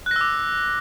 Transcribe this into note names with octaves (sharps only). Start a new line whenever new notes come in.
D6 E6 F#6 A#6